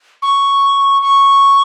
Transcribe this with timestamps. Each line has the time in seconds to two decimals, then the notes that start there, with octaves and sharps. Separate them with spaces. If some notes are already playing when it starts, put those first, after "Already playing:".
0.22 C#6
1.02 C#6